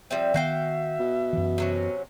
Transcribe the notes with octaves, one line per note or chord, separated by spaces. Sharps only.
F3 G3 C4 E5
D#3 B3 F#4 F5 G5
B2
F#2 E3
C3 F#3 C#4